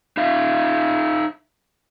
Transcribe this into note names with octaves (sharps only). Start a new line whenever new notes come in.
D#4 E5 F5